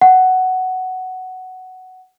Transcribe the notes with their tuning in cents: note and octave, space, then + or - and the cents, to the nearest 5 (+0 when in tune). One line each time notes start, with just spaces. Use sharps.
F#5 +10